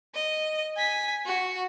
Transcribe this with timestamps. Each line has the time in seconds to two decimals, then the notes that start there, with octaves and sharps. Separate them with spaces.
0.14 D#5
0.77 G#5 B6
1.26 F#4